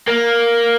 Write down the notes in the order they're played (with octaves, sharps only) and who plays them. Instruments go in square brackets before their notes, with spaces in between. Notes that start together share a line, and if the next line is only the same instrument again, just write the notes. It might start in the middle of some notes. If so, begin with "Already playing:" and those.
[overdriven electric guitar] A#3